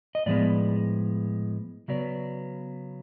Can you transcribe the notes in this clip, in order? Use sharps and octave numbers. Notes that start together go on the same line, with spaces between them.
D#5
A2 F3 G#3 B3 D5
C#3 F#3 B3 D5